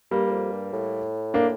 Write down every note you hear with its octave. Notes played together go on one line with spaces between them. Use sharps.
G2 G3 A#3
G2
F2
G2
A2
A#3 D4